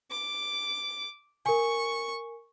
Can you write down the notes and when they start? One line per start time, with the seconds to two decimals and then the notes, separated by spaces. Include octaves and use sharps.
0.11 D6
1.46 A#4 G#5 C#6